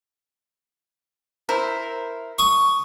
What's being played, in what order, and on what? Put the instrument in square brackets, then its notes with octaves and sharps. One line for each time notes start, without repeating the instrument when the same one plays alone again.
[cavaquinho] E4 A#4 C5
[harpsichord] C#6 D#6